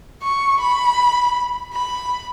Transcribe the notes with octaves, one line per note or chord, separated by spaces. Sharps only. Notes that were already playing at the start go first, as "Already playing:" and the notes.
C#6
B5
B5